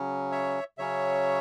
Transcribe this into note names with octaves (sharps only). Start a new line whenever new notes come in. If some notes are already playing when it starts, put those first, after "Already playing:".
Already playing: C#3 F#3 C#4
C#5 E5
C#3 F#3 C#4 C#5 E5